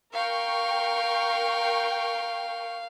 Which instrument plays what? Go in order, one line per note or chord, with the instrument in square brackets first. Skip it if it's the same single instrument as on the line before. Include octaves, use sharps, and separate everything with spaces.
[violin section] A#4 G5 C#6 [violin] F5